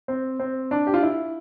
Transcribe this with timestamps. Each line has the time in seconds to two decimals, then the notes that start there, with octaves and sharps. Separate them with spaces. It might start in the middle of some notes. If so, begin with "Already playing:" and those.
0.08 C4
0.40 C4
0.71 D4
0.87 G4
0.94 F4
1.03 E4